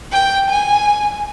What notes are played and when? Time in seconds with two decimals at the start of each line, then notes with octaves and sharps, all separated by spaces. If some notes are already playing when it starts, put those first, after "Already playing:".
0.12 G5
0.50 G#5